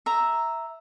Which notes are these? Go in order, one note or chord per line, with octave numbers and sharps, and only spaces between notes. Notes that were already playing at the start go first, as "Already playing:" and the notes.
E5 A#5